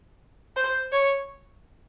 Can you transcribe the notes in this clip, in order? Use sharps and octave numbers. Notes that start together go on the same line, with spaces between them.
C5
C#5